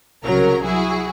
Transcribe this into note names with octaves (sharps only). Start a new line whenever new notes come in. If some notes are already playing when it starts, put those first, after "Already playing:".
C2 C#3 F#3 A#4 A#5
F#3 E4 F#4 G#4